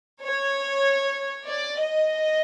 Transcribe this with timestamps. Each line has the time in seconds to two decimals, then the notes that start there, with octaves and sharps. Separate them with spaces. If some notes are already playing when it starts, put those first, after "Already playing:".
0.22 C#5
1.47 D5
1.79 D#5